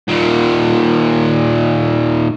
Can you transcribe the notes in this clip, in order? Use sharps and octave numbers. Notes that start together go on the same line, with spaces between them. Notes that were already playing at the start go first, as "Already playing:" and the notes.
D#2 A#2